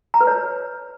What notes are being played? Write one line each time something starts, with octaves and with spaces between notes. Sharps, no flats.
A#5
B4
C#5